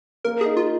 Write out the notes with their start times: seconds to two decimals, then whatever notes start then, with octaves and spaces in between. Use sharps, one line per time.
0.24 A#3 A#4
0.41 G#4
0.46 D#4
0.57 F4